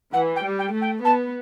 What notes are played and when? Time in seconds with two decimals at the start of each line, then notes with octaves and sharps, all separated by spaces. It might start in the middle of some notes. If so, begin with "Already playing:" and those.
0.12 E3 F#5
0.35 G5
0.43 G3
0.58 G5
0.74 A3
0.81 G5
1.04 B3 A5